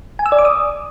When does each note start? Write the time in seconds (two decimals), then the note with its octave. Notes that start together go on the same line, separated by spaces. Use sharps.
0.19 G#5
0.26 E6
0.32 D5
0.38 D6
0.45 D#6